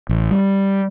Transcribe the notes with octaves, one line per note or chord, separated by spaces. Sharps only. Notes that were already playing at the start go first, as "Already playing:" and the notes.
A1
G3